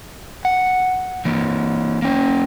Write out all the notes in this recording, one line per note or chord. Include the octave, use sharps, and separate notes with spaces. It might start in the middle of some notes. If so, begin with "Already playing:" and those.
F#5
E3 A#3
A#3 C#4